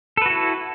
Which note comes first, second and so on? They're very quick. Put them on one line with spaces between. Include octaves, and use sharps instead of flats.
A4 B4 F#4 E4